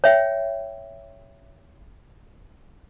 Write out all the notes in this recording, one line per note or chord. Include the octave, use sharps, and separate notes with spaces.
C#5 E5 G5